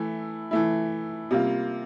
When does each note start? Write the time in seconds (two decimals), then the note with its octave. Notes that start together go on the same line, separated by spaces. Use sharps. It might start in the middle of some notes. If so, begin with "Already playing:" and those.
Already playing: E3 A3 E4
0.51 E3 A3 E4
1.31 C3 G3 A#3 F4